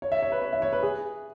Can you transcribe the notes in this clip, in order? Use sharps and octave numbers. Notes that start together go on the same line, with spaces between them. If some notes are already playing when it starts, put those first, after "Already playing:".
C#5
E5
C#5
B4
C#5
E5
C#5
B4
G#4